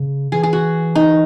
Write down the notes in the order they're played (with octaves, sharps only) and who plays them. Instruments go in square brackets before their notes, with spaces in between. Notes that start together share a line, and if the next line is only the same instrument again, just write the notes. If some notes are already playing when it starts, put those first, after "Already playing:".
Already playing: [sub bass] C#3
[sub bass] E3 [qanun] G#4
[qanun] G#4
F#4
D#4